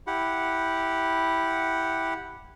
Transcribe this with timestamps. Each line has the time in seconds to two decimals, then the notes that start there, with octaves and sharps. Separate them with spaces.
0.07 E4 G4 F#5